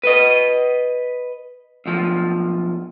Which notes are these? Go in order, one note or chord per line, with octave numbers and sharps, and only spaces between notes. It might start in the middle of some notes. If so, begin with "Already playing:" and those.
B4 D#5
B1 F3